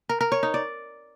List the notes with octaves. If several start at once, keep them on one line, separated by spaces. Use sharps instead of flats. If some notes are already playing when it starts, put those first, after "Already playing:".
A#4
A#4
C#5
D#4
D5